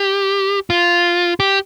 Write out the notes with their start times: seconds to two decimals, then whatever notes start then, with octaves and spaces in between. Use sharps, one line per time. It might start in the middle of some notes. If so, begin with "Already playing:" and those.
Already playing: G4
0.70 F4
1.40 G4